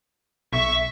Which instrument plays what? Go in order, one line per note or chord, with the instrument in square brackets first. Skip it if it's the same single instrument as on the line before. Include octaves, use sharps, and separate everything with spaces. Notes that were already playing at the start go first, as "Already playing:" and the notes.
[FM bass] B1 [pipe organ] E5 C#6